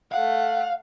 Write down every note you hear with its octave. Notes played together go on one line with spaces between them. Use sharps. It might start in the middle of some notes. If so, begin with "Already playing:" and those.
A3 F5 F#5